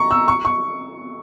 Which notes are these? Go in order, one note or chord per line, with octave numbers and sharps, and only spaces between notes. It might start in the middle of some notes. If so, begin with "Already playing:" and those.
Already playing: A#5 C#6
E6
C#6
C#6